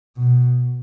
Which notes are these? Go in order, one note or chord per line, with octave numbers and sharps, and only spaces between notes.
B2